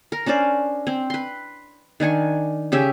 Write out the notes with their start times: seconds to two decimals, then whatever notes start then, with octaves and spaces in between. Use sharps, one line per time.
0.12 A#4
0.26 C#4 D4 C5 D5
0.87 C4
1.10 B4 C6
2.00 D#3 D4 G#5 C#6
2.72 C#3 C#4 G4 E5